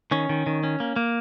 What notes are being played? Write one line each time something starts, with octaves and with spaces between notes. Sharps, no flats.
D#3 C#4
D#3
D#3
C#4
A#3
A#3